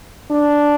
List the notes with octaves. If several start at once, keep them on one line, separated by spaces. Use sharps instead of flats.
D4